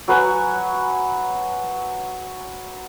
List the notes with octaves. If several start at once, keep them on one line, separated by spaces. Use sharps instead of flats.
F#3 B4 F#5 G#5